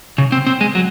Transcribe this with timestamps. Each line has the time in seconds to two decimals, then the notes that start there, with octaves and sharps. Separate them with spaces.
0.18 C#3
0.32 C4
0.47 C4
0.61 G#3
0.75 F#3